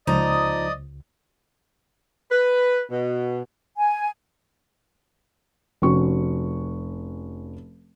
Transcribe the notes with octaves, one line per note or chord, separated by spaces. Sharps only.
C#2 F3 D#4 D5 D#5 A#5 D#6
B4
B2
G#5
F1 C#4 F#4 C#6